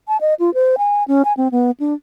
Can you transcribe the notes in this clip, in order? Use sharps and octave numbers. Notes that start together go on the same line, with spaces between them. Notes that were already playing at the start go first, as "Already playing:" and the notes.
A5
D#5
F4
C5
G#5
C#4
G#5
C4
B3
D4